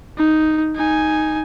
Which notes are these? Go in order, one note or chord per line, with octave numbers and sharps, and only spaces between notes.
D#4
D#4 G#5